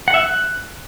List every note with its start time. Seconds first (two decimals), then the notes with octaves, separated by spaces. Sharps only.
0.08 F#5
0.14 E5
0.20 F#6